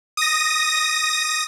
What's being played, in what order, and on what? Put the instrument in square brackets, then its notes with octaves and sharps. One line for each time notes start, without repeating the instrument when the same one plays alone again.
[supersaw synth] D#6 A#6